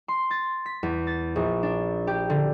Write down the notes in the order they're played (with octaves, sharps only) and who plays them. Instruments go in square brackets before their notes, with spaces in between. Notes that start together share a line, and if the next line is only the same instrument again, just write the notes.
[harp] C6
A6
B6
E2
A6
A#1
D4
G4
D3